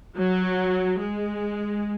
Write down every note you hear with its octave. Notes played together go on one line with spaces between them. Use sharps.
F#3
G#3